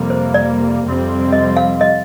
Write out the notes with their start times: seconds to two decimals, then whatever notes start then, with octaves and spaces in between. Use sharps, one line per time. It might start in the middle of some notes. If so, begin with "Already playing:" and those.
Already playing: F2 C3 G3 A#3
0.10 C5
0.34 D5
0.83 F2 C3 G3 C4
1.33 D#5
1.57 F5
1.81 D#5